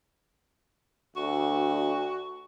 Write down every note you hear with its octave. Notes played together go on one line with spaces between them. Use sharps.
D2 F#4